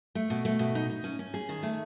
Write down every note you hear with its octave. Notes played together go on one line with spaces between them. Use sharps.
A3
B2
A3
B2
D#4
D#4
C#4
C#4
G#4
D#3
A3